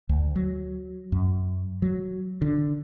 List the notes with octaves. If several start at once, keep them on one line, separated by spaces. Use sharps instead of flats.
D2
F#3
F#2
F#3
D3